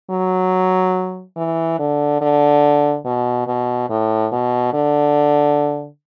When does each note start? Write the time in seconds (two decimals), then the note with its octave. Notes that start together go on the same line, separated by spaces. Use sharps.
0.10 F#3
1.37 E3
1.79 D3
2.21 D3
3.06 B2
3.47 B2
3.89 A2
4.32 B2
4.74 D3